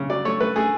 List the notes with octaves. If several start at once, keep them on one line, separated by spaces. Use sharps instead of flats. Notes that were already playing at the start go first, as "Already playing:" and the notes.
Already playing: C#3
F#3 D5
A3 C#5
A3 B4
A3 G#4